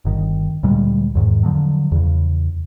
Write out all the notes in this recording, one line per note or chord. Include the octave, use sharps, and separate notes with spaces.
G1 D#3
D2 A#2 G3 G#3
E2 G#2 D#3
D3 D#3 F3 F#3
E2 C#3